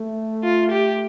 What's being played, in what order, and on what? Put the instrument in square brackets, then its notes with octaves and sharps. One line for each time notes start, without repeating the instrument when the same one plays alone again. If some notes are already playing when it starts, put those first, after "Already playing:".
Already playing: [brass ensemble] A3
[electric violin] F4
G4